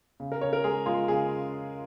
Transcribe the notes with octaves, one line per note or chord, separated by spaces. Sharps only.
C#3
A#4
C#3 C#5
A#4
G#3 G#4
G#3 F4
C#3 G#4